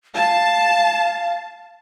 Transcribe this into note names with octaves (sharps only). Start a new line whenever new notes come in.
F5 A5